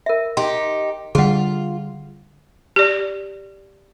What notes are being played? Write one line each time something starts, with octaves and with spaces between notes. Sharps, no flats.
A#4 E5
D#4 G4 C6
D3 G3 F4 G#4 F#5
G4 D5